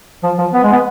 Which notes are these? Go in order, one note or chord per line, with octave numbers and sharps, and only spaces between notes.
F3
F3
B3
G#3
B3